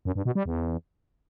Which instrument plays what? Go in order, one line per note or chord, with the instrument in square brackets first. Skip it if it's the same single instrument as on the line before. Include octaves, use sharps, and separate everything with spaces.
[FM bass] F#2
G2
B2
G3
E2